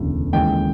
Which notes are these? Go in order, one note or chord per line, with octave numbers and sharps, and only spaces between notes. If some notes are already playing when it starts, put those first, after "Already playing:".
Already playing: E1 D2 C#3 E3
D#2 C#3 E3 G#3 G5